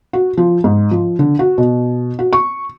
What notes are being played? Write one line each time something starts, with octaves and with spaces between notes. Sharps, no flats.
F#4
F3
G#2
F3
D3
F#4
B2
F#4
C#6